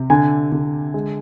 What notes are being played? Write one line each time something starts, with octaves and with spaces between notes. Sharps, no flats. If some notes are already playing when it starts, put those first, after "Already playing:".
Already playing: C3
D3 G#5
D3
G#3